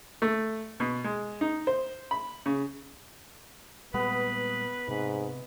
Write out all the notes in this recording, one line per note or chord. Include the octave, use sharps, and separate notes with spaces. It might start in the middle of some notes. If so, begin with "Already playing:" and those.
A3
B2
G#3
D#4
C5
B5
C#3
A#2 G3 G#3 B3 B4
G#2 C3